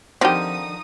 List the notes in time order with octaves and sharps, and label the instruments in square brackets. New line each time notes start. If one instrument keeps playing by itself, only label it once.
[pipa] D3 D#3 G3 [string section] F3 D#4 D#6 [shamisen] C4 G4